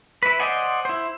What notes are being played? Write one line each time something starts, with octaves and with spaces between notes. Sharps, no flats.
E4 B4
C5 D5 D#5 F#5 G#5
E4 C5